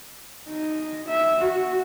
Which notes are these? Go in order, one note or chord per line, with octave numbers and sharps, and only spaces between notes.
D#4
E5
F#4